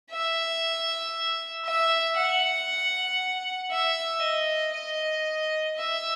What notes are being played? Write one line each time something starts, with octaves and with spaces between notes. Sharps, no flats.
E5
E5
F#5
E5
D#5
D#5
E5